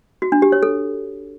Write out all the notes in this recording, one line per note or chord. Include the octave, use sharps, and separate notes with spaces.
F#4
D4
G4
C#5
A4